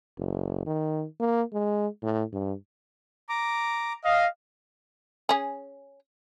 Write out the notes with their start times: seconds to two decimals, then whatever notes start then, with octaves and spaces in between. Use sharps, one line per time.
0.18 F#1
0.66 D#3
1.20 A#3
1.53 G#3
2.03 A2
2.32 G2
3.29 A#5 D6
4.04 D#5 F5
5.29 C#4 G#4